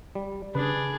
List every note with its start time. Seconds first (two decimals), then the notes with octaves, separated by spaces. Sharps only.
0.15 G3
0.55 C#3 D4 G#4 B4 D#6